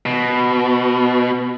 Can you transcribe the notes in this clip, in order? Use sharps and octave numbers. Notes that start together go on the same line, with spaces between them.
B2